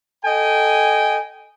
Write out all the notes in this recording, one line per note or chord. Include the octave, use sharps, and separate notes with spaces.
A4 D#5 G5 G#5